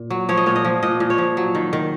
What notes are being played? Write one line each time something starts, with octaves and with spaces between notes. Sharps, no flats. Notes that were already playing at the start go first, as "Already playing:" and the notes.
Already playing: A#2
F#3
F3 C#5
D#5
A#2 C#5
D#5
F3
A#2 D#5
A#2
C#5
F3
F#3
D#3
D#3